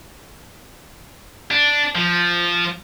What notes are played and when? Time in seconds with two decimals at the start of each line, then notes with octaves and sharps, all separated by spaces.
1.51 D4
1.96 F3